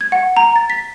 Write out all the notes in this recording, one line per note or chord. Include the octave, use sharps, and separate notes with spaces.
G#6
F#5
A#5
A6
B6